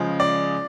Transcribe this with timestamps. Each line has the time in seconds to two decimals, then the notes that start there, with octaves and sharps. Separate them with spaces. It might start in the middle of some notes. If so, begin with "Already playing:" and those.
Already playing: C#3 F3 G#3
0.20 D5